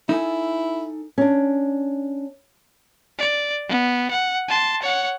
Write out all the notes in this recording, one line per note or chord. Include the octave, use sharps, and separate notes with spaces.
D#4 E4 A4 G#5
C#4 D4
D5
B3
F#5
A5 C6
C#5 F#5